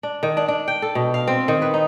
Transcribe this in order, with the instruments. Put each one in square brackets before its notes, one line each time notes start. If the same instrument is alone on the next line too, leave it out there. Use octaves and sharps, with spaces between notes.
[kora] D4
D#3
D4
D4
G5
A4
B2
F5
C4
D#3
B4
D#4